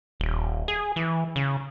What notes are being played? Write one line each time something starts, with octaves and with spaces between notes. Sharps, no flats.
D#1
G#4
E3
C#3